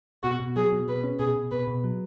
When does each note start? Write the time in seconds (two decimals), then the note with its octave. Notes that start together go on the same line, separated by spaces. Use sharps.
0.23 B2 F#4
0.40 B2
0.56 F#3 G#4
0.72 B2
0.88 B2 B4
1.04 C#4
1.19 B2 G#4
1.36 B2
1.51 B2 B4
1.67 B2
1.84 F#3